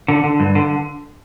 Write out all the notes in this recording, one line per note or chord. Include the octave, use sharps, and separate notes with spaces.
D3
D3
G2
D3